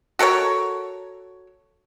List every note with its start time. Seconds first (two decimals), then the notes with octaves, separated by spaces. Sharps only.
0.19 F#4 A4 A#4 C#5